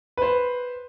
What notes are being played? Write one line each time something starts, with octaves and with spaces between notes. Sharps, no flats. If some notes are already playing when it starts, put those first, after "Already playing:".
B4 C5